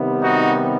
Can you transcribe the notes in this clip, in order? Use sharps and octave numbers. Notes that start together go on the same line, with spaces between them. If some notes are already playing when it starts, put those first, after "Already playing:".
Already playing: C3 D#3 G3 B3
D#4 F#4